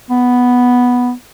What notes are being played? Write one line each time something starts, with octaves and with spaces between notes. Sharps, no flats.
B3